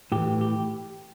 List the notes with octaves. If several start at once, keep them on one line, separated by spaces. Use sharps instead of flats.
A2 E3 G4
G4